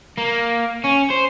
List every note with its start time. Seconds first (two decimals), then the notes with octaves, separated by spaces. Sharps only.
0.17 A#3
0.84 C#4
1.10 C5